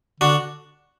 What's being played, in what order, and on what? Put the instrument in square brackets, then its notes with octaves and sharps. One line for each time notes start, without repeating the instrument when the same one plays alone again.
[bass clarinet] D3 [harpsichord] D4 F#4